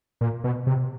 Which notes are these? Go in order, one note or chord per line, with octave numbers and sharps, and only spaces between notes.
A#2
B2
C3